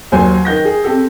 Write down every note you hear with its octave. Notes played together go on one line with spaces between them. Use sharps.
D#2 F#3 C5 G#5
D#3 G6 A#6
G#4
C4 G4 A4